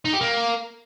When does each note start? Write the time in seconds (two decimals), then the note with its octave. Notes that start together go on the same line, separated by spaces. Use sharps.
0.05 D#4
0.13 G4
0.21 A#3